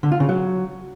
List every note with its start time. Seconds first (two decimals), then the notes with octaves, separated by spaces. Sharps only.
0.03 D3
0.12 F4
0.20 C#3
0.29 F#3